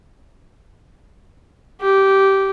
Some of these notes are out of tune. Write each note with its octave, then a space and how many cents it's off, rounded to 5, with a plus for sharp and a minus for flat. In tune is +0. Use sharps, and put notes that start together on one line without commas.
G4 -15